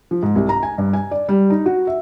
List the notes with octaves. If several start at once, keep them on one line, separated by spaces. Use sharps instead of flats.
F3
G#2
C2
A#5
G#5
G2
G#5
D5
G3
D#4
F#4
E5